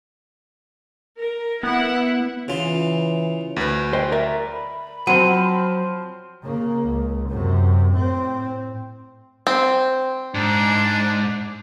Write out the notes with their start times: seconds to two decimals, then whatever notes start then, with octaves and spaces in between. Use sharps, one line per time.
1.18 A#4
1.63 B3 E4 F#5
2.48 C#3 E3 F4
3.56 D2 B4
3.93 C5 D#5 G5
4.12 A#4 D5 E5
4.52 B5
5.07 F3 F#3 C4 C5 F#5 D#7
6.43 C#3 A#3
6.85 C#2
7.29 F#2 C3
7.92 A2 C4
9.47 C4
10.35 G#2 D4